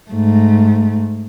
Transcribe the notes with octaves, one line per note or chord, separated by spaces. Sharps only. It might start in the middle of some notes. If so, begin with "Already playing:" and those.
G#2 A3